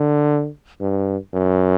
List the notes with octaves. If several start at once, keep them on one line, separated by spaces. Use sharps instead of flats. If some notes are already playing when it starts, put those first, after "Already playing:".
Already playing: D3
G2
F#2